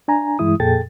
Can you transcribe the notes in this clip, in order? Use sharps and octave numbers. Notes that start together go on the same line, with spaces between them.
D4 G#5 A#5
G2 E3 G#3 E4 D#6
F2 A#2 G#4 A4 G5 A6